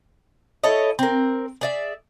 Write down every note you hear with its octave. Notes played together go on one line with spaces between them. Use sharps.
E4 A4 C#5 D#5
C4 A#4
G#4 D5 E5